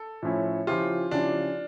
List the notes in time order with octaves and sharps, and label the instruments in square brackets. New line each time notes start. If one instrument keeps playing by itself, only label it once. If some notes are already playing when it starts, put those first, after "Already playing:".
Already playing: [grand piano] A4
[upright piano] A2 F3 C#4 E4
[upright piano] C#3 F3 C#4 E4 G4 [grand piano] F4
[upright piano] C#3 F3 C#4 E4 G4 [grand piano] D4